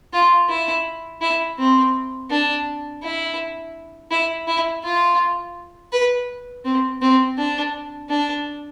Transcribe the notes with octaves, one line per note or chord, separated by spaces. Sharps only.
F4
E4
E4
C4
D4
E4
E4
E4
F4
B4
C4
C4
D4
D4